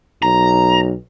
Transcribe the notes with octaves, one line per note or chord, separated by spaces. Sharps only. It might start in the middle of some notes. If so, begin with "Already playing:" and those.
B1 A#5